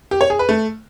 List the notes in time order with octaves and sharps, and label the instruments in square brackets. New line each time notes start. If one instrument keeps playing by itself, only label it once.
[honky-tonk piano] G4
C#5
G#4
B4
A3